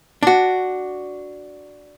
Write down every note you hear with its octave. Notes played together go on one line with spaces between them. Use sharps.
D4 F#4